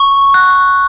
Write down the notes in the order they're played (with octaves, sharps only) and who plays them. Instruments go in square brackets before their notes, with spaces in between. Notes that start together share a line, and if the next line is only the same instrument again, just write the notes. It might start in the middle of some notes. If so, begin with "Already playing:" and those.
Already playing: [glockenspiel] C#6
F#6